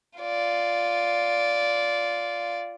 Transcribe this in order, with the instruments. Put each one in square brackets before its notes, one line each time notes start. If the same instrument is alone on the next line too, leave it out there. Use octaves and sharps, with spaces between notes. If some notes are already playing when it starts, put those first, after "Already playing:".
[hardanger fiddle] F4 D5